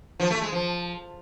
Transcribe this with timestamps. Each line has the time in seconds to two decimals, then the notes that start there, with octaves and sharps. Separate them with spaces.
0.20 F3
0.31 A3
0.41 G#3
0.52 F3